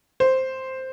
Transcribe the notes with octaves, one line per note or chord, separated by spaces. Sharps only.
C5